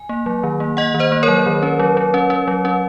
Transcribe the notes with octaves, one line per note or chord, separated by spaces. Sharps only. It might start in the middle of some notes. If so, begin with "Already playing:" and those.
Already playing: G#5
A#3
F#3
D#3
A#3
A#3 D#5 F#5
D#3
C5 D#5
A#3
A#4 C#5
F#3
D#3
C#4
F#3
F#3
C#4
C#4
F#3
C#4